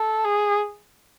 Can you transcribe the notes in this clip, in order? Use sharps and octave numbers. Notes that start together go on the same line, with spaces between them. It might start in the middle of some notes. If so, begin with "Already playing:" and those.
Already playing: A4
G#4